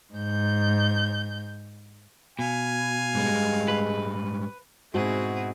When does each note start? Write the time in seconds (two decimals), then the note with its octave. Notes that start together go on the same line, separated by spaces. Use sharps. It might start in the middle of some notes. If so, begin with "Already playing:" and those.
0.14 G#2 G6
2.39 B2 F5 G#5
3.15 G#2 G3 G#3
3.68 B4
4.94 G#2 B2 C4 E4 F#4 G#4